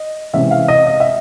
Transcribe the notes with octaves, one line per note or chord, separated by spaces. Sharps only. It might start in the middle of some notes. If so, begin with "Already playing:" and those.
Already playing: D#5
C3 E3 G#3 C#4 E5
F5
D#5
D#5
E5